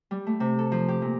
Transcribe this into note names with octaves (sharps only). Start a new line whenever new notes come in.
G3
A3
C3
A4
F3
G4
A#2